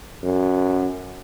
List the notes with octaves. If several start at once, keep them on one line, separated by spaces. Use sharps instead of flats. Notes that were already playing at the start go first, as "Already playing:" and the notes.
F#2